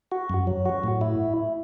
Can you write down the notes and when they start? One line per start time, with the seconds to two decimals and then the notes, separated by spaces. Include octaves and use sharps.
0.12 F#4
0.30 F#2
0.47 F#3
0.66 F#4
0.84 A2
1.01 E4